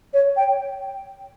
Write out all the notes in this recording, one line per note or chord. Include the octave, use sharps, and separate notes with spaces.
C#5
G5